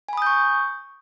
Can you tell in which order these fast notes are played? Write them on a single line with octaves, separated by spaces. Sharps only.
G#5 B5 D#6 G6 C#6